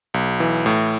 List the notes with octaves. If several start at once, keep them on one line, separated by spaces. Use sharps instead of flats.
B1
E3
A2